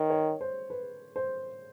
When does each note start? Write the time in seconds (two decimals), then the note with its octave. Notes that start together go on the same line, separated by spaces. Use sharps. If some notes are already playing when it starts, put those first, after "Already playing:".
Already playing: D#3 C#5
0.10 C#5
0.41 C5
0.70 B4
1.16 C5